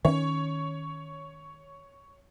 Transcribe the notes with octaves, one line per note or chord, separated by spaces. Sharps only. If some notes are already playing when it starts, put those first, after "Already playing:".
D#3 C#4 C#5